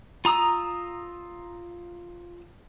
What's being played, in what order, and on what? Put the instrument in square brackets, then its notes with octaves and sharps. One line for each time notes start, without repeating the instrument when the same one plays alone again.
[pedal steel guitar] F4 A#5 D#6 E6